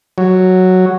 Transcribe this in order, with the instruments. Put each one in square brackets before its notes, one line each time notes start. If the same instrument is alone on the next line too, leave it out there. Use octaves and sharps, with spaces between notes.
[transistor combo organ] F#3